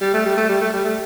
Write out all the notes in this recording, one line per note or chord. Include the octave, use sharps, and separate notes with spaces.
G3
A3
G3
A3
G3
A3
G3
A3